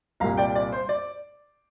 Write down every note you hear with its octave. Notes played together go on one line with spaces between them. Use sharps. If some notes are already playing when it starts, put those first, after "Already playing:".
C2 A#2 G3 A#3 F5 A#5
D5 G5
D5
C5
D5